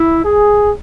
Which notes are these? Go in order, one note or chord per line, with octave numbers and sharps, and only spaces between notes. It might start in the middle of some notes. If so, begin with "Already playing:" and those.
Already playing: E4
G#4